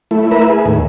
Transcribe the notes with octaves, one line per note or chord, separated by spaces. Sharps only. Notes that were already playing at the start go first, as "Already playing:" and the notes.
A3 E4
A#4 B4 E5
G#4
D#2 A2